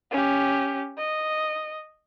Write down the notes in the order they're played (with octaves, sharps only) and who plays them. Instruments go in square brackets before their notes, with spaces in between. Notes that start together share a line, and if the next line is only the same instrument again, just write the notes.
[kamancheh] C#4 G4
D#5